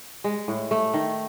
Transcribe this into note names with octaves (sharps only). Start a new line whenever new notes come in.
G#3
A2
A3
D#3